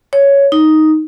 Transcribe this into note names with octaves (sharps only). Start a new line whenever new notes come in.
C#5
D#4